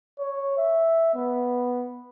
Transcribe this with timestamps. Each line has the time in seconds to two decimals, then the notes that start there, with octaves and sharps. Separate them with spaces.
0.19 C#5
0.58 E5
1.15 B3